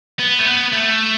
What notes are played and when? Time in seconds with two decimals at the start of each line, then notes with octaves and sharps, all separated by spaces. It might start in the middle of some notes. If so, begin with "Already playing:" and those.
0.20 B3
0.39 A3
0.46 B3
0.72 A3